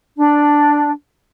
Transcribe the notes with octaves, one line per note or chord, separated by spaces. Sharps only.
D4